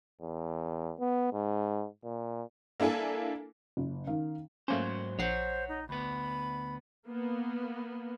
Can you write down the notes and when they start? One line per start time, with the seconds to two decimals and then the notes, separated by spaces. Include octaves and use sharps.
0.21 E2
0.99 B3
1.33 G#2
2.04 A#2
2.80 A#3 D4 E4 A4 G#5
3.77 F#1
4.07 D#3 F5
4.68 G#2 F#3 A3 A#3 C#4 C5
5.19 A#1 C5 C#5 F#5 C7
5.69 D#4
5.89 D2 B3 B5
7.07 A#3 B3